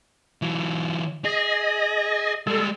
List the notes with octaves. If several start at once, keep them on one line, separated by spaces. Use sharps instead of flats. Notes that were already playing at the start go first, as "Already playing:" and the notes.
E3 F#3
G#4 D#5
G3 G#3 A4